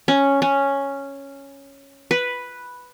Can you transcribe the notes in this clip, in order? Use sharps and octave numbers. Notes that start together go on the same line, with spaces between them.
C#4
C#4
B4